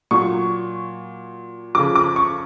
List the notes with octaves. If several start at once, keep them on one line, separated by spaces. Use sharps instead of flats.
A#2 F#3 C#6
C#3 F3 D6
D6
C#6